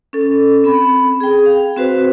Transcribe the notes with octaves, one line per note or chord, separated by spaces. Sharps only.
C#4 A4
C4 B5
G#4 G5
F5
C4 F#4 B4 C5